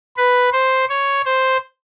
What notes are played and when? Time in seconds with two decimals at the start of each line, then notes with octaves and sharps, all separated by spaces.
0.17 B4
0.52 C5
0.89 C#5
1.25 C5